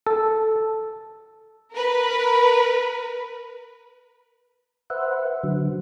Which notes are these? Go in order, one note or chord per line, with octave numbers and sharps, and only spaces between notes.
A4
A#4 B4
B4 C5 E5 F#5
D3 F#3